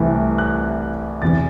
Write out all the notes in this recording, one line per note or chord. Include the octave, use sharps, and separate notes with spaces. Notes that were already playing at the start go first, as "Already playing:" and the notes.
Already playing: C2 C3 E3 A3
F#6
E2 C3 E3 A6